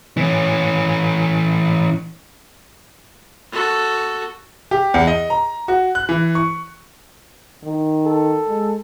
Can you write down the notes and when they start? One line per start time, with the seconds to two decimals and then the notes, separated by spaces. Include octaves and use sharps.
0.17 E3 C#4
3.52 F#4 A4
4.71 G4
4.94 E2
5.07 D#5
5.30 A#5
5.68 F#4
5.95 F#6
6.09 E3
6.35 C#6
7.64 D#3
8.06 A4
8.48 G#3